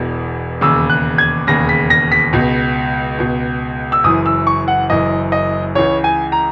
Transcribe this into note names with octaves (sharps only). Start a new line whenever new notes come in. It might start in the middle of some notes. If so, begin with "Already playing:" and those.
Already playing: E1 E2 B2
E1 D#2 C#3 E6
F#6
G#6
E1 D#2 C#3 A#6
B6
A#6
B6
C#2 B2
C#2 B2
E6
F#1 F#2 E3 D#6
E6
C#6
F#5
F#1 F#2 E3 D#5
D#5
C#2 C#3 E3 C#5
G#5
A#5